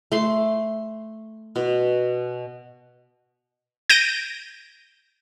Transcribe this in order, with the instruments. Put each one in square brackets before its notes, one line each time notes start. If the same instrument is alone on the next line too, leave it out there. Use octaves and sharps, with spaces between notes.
[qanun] A3 C6
B2
[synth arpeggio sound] G6 A#6 D7 D#7